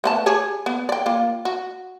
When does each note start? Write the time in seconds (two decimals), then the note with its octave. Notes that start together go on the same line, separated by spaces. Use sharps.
0.04 A3 B3 A5
0.26 G4 G#4 C#5
0.66 B3
0.89 D5 G5
1.06 A#3 F4
1.45 F#4